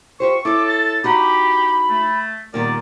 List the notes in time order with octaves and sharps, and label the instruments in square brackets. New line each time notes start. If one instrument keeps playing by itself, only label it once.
[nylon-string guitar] F4 G4 C5 [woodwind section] C#6
[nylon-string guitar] E4 C#5 [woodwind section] A4 [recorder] D6
[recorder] A6
[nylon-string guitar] D#4 F#4 F#5 [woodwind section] G4 [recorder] B5
[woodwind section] A3
[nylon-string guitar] A#2 D#3 G3 [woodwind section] B3 A#4 D5